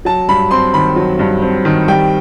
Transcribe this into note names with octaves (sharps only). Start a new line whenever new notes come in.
F#3 A5
G2 B5
C4 C6
D#3 B5
F#3
G2
C4
D#3
G3 G5